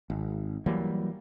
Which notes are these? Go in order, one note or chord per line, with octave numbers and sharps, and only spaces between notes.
G#1
E3 F#3 G3 A#3